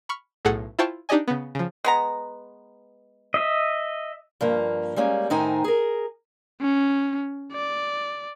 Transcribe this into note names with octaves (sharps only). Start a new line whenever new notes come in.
B5 C#6 F6
B1 A2 G#4 A4 F#5 C#7
E4 F4 C5 G5 A5 C#6
D4 D#4 G4 D5 D#5 G#5
C#3 B3
C#3 F3
G#3 B3 A#5
D#5 E5
G2 F3 A#3
G3 G#3 A#3 C#4
A2 D#3 D#4 C5 D#5 G#5
G#4 A#4
C#4
D5